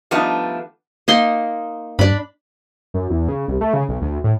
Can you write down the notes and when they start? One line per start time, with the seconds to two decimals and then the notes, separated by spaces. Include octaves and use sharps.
0.11 F3 G3 A3 B3 D4 D#4
1.08 A#3 D#4 C6
1.99 G2 D4 B5
2.94 F#2
3.10 E2
3.28 C#3
3.48 C2
3.61 A3
3.74 C#3
3.89 B1
4.02 D2
4.24 A2